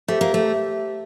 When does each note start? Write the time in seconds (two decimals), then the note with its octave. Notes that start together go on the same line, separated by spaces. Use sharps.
0.08 A3 G4 C5 E5
0.21 A#3
0.34 A3